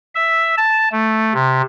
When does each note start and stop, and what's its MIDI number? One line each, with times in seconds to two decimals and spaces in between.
0.15 0.55 76
0.57 0.89 81
0.92 1.33 57
1.34 1.62 48